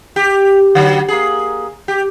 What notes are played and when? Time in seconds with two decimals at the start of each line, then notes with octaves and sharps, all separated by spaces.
0.16 G4
0.75 D3 F#3
1.08 A#3 G#4
1.88 G4